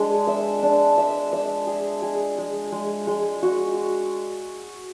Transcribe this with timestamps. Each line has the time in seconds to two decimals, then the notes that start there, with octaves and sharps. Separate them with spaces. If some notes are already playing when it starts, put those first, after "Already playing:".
Already playing: G#3 D4
0.27 E5
0.62 D4
0.98 E5
1.33 E5
1.67 G#4
2.02 G#4
2.38 G#3
2.72 G#3
3.07 G#3
3.42 F#4